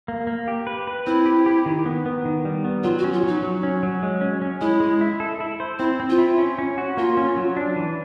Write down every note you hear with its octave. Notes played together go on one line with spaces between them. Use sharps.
A#3
A#3
G4
B4
B4
C4 E4
G4
G4
D#3
B3
B3
D#3
G3
B3
F#3 F4
F#4
C#4
F4
F#3 D#4
F#3
C#4
F#3
G#3
C#4
C#4
G#3 E4
G#3
E4
A4
E4
C5
C4 E4
C4
F4
E4
C#4
C#4
F#4
A#3 F4
C#4
F#3
D4
E3